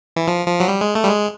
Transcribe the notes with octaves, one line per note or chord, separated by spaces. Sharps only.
E3
F3
F3
F#3
G3
G#3
A3
G3
G#3